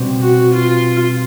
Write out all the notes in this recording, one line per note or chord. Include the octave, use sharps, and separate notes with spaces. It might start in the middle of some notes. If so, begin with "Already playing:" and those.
Already playing: B2 G3 C4
F#4
F4